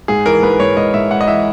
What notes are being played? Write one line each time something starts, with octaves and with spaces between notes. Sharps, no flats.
G#2 G#4
E3 A#4
G#2 B4
G#2 C#5
G#2 D#5
G#2 E5
G#2 F#5
D#5
E3 E5